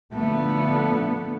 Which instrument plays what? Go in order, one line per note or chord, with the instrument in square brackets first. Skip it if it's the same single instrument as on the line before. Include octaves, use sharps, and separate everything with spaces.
[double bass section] D3 F3 A3 [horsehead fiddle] B3